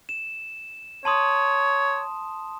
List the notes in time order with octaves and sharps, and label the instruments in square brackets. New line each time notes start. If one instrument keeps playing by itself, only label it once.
[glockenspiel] E7
[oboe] C#5 [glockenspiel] A5 C6 D#6